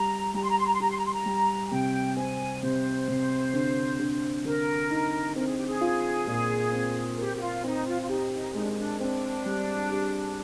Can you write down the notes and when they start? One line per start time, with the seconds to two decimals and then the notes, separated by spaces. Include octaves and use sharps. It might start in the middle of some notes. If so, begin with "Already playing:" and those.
Already playing: G3 A#5
0.34 G3 A#5
0.42 C6
0.50 A#5
0.58 C6
0.67 A#5
0.74 C6
0.80 G4 A#5
0.89 C6
0.98 A#5
1.05 C6
1.13 A#5
1.26 G3
1.67 G#5
1.71 C3 G5
2.16 C4 G#5
2.62 C3 C5
3.08 C3
3.54 D3
4.00 D3
4.45 D3 A#4
4.90 D#4
5.36 C4 A#4
5.47 G#4
5.57 G4
5.67 G#4
5.81 F4
6.27 A#2
6.72 C4
7.18 G4 A#4
7.35 G4
7.40 F4
7.64 C4 D#4
7.86 F4
8.01 F4
8.09 D#4 G4
8.31 D#4
8.55 G#3 D#4
8.62 D4
8.70 D#4
8.77 D4
9.00 C4 D4
9.46 G3
9.91 G4